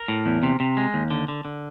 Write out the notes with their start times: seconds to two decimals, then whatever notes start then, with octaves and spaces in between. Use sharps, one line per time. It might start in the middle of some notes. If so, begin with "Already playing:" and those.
Already playing: A#4
0.08 A2
0.26 E2
0.43 C3
0.60 C3
0.77 G#3
0.94 D#2
1.11 D3
1.28 D3
1.45 D3